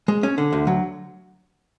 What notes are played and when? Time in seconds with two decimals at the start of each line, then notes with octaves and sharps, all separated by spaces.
0.08 G#3
0.23 C#4
0.38 D3
0.53 D2
0.67 F#3